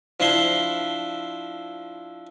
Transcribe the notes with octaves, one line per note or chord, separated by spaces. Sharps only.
F3 D4 E4 C6